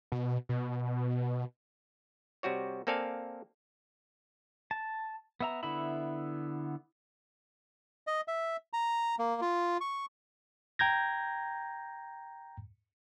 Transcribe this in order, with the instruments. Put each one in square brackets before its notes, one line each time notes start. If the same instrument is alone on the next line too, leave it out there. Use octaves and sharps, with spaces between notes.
[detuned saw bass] B2
B2
[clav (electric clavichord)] C3 G3 F#4 C#5
A#3 C4 A4 D5 F5 G#5
[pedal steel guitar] A5
B3 E5 A#5
D3 B3 E4 E5 B5
[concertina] D#5
E5
A#5
A#3
F4
C#6
[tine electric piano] G5 A#5 G6 G#6 A#6